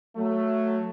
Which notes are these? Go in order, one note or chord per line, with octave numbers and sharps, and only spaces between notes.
F#3 A3